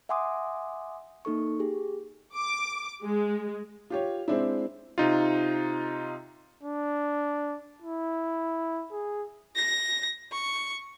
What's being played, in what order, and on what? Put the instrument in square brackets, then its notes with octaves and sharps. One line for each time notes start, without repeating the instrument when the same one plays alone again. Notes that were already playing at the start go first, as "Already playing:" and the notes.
[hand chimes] E5 F#5 G#5 C6 D6 D#6
A#3 D#4 A4 C#6
G4 G#4
[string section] D6
G#3
[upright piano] F4 G4 C#5
G#3 C4 D4 E4
[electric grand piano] C3 D#4 F4
[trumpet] D4
E4
G#4
[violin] A#6
C#6